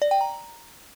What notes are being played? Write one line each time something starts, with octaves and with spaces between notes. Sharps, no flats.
D5
G5
A#5